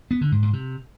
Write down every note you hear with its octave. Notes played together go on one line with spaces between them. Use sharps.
B3
D3
G#2
G#2
C3